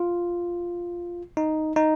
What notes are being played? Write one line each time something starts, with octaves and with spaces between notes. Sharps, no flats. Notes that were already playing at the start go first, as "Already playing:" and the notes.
Already playing: F4
D#4
D#4